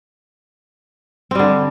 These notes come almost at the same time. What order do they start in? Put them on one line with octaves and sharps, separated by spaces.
C4 G3 D3